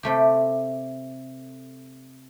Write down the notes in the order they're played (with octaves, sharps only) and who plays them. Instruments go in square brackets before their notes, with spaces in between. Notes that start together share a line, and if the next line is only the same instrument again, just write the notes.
[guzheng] C3 A3 G4